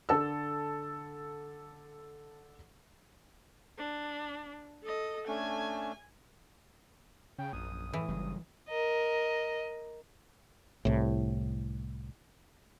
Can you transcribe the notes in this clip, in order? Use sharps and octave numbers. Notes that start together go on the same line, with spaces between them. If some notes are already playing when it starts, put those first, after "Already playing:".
D3 A4 E6
D4
A4 D#5
A3 C#4 D4 G#5
C#3 G5
A#1 F#2 D#6
A2 E3
G1 G2 C#3 F#3
A#4 D#5
C2 A2